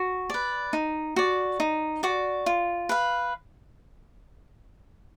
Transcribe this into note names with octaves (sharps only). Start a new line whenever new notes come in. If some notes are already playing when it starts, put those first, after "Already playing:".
Already playing: F#4
B4 D5
D#4
F#4 D5
D#4
F#4 D5
F4
B4 F5